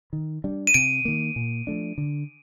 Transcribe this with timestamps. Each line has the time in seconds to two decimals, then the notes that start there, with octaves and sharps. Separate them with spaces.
0.13 D#3
0.44 G3 D4
0.67 D#7
0.74 C3 D7
1.05 D#3 A#3
1.36 A#2
1.67 F3 A3 D4
1.98 D3